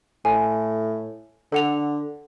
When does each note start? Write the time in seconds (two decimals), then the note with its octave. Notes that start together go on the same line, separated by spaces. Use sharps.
0.25 A2 G#5
1.52 D3 A4 F#5 F7